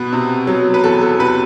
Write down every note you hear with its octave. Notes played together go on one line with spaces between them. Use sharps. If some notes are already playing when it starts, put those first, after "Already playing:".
Already playing: B2 B4
C3
F#3
B4
E2 A4
A4
C3 B4